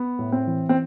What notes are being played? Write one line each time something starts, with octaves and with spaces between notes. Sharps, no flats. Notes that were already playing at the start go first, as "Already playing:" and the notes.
Already playing: B3
A2
C4
E3
C4